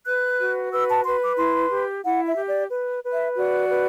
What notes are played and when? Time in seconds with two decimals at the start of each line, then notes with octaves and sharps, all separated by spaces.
0.06 B4 F#6
0.39 F#4
0.72 B4 E6
0.89 A5
1.05 B4 C6
1.22 D6
1.38 E4 C6
1.71 G4
2.05 E4 F#5
2.26 E5
2.37 G4
2.48 D5
2.70 B4
3.03 B4
3.13 E5
3.36 F#4 D5
3.69 B4